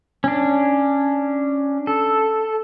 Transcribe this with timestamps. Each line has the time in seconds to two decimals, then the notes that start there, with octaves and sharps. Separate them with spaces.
0.24 C#4 D4
1.87 A4